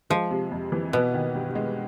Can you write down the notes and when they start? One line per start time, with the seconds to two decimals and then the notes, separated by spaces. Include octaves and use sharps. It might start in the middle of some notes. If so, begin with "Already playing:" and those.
0.10 F3 G#3
0.31 C3
0.52 F2
0.72 E3
0.93 B2 B3
1.14 D#3
1.35 G2
1.55 G#3